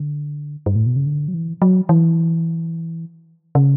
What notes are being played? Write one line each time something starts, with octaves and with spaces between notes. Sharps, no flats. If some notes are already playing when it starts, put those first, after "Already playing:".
Already playing: D3
G2
A2
B2
C#3
D3
F#3
E3
F#3
E3
C#3